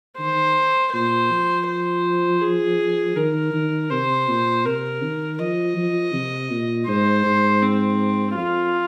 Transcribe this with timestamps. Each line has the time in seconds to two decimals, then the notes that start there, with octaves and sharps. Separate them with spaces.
0.19 D#3 C5
0.93 A#2 C5
1.31 F3
1.68 C5
2.42 G#4
3.17 D#3 A#4
3.54 D#3
3.91 C3 C5
4.28 A#2
4.65 C3 A#4
5.03 D#3
5.39 F3 D#5
5.77 F3
6.14 C3
6.51 A#2
6.88 G#2 C5
7.26 G#2
7.62 C4
8.36 F2 F4